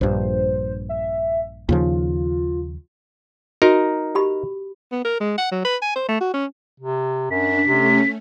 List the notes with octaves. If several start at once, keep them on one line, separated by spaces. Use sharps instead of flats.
A#1 G2 C5
E5
D#2 C#3 F3 F4
D#4 F#4 A#4
G4 B5
B3
A#4
G#3
F#5
F#3
B4
G#5
C5
A3
F#4
C#4
C3
F#2 D4 B6
C3 A3 C#4